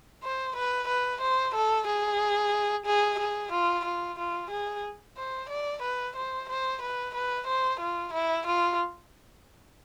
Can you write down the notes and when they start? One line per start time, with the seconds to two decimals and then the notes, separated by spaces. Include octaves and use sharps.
0.23 C5
0.56 B4
0.88 B4
1.21 C5
1.54 A4
1.87 G#4
2.86 G#4
3.19 G#4
3.52 F4
3.85 F4
4.18 F4
4.51 G#4
5.17 C5
5.49 D5
5.82 B4
6.16 C5
6.49 C5
6.82 B4
7.15 B4
7.47 C5
7.80 F4
8.13 E4
8.46 F4